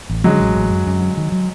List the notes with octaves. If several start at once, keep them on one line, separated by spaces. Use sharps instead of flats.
A1
D3 F#3 G#3
A1
A1
F#2
F#2
F#3
D#3
F#3